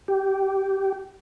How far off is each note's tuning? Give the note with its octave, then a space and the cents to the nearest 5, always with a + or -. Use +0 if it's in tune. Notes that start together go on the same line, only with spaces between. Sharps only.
G4 -15